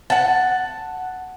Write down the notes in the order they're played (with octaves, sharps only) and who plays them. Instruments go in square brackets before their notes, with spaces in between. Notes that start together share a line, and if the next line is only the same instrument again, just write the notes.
[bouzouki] F#5 A5